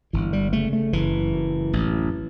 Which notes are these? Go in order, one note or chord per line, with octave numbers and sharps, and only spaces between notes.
G1 E3
G3
C#3 A3
A3
F#1 E3
F#2
A1